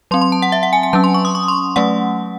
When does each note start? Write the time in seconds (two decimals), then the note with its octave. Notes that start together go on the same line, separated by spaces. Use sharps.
0.11 F#3 C4 C6
0.21 C6
0.32 A5
0.42 F#5
0.52 E5
0.63 F#5
0.73 G#5
0.83 G#5
0.93 F#3 C#4 A5
1.04 C6
1.14 C#6
1.25 D#6
1.35 C#6
1.48 C6
1.76 F#3 A3 C#4 F#5